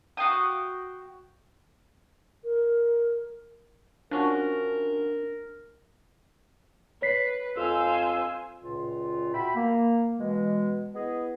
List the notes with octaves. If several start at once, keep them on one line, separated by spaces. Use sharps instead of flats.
F#4 F5 G5 D#6
A#4
F3 C#4 D4 F#4 A#4
B4 C#5 B6 C7
F2 C5 F5 G#5 E6
C#2 A#2 F4
F#4 E5 G5 B5
A#3
B2 E3 G#3
B3 E4 G#4 D#5